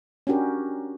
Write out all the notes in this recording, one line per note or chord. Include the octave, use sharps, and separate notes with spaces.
C#4 D4 F#4 G4 A#4